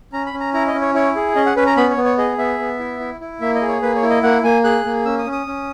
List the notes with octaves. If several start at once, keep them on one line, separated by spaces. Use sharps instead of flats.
C#4 A#5
B5
C#4
A#5
E4 A#5
D#5
C#4
C#5
E4 C#5
G#4
C#4 D#5
F#5
C#4 B4
A#5
B3 B5
C#5
B3
C#5
G#4 D#5
B3 E5
B3
E4
E4
E4
A#3 E5
D#5
G#4
C#5
A#3 B4
C#5
E4
D#5
A#3 F#5
A#3 G#5
G#4 F#6
A#3
C#4 E6
D#6
C#4
D#6
C#4